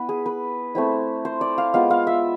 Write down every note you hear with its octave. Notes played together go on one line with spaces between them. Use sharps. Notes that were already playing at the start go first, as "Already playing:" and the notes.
Already playing: B3 E4 B4
G#4
B4
A3 C4 E4
C5
D5
F5
G#3 B3 F4 F5
F5
E5